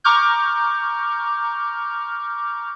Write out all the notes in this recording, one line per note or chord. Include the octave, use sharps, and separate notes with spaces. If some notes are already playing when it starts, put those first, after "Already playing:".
A#5 C#6 D6 F6 G6